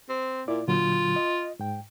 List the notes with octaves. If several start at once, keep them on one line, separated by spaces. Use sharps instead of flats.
C4
A#2 E4 D5 D6
A#2 D3 F#3 F4
D#5
G#2 G5